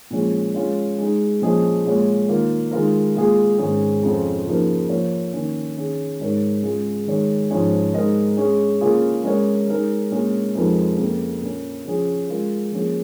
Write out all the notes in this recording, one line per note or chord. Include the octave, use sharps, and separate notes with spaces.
A#2 F3 G#3 C#4 G#4
G#3 C#4 F4 C#5
G#3 D#4 G#4
A#2 F3 C#4 G#4 D#5
A#2 G#3 F4 C#5
D#3 A#3 F4
D#3 G#3 F4 A#4
A#2 G#3 F4 G#4
G#2 D#3 G#3 C#4 G#4
F2 C#3 F3 C#4 F4
C#3 F3 A#3 D#4 A#4
F3 A#3 F4 C#5
D#3 A#3 C#4
D#3 C#4 G#4
G#2 G#3 D#4 A#4 C#5
C#3 G#3 F4
D#3 G#3 D#4 C#5
G#2 F3 C#4 G#4 C#5
G#2 G#3 D#4 A#4 D#5
G#3 C#4 G#4
C#3 A#3 C#4 F4 G#4
G#3 C#4 A#4 C#5
G#3 D#4 A#4
A#2 G#3 C#4 A#4
F2 F3 G#3 D#4 A#4
F2 C#3 A#3
A#2 A#3 C#4
C#3 F3 C#4 G#4
G#3 F4 A#4
F3 A#3 C#4 G#4